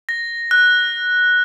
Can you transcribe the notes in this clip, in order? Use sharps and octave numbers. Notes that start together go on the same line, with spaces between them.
A#6
F#6